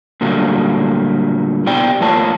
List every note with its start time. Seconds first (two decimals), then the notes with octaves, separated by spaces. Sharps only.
0.21 A#2 D3 F#3 G3 A3 A#3
1.66 B3 E4 G4 D5 G5
2.01 A2 F3 A#3 F4 C#5 A5